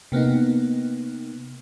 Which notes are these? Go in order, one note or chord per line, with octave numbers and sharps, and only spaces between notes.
C3 A#3 B3 D#4